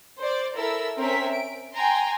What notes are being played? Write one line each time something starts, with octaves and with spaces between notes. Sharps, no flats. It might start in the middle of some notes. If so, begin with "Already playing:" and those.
C5 D5
E4 A4 A#4 E6
C4 C#4 A#4 E5 B6
D7
G5 G#5 A#5 C6